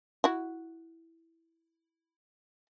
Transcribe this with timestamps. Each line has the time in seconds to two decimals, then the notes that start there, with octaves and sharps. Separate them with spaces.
0.24 E4 F#4